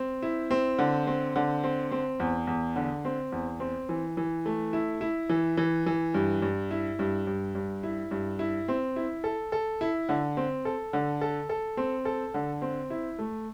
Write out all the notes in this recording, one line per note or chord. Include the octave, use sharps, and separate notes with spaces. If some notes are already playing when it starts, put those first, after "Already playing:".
Already playing: C4
E4
C4
D3
C4
D3
C4
C4
E2
E2
D3
C4
E2
C4
E3
E3
A3
E4
E4
E3
E3
E3
G2
G2
E4
G2
G2
G2
E4
G2
E4
C4
E4
A4
A4
E4
D3
C4
A4
D3
A4
A4
C4
A4
D3
C4
E4
A3